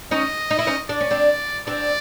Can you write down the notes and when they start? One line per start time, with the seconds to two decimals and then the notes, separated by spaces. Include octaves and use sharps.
0.11 C#4 D#4 D#5
0.51 D#4
0.59 E4
0.67 C#4 D#4
0.89 D4 D5
1.01 C#4
1.11 C4 D4
1.67 C4 D4 D5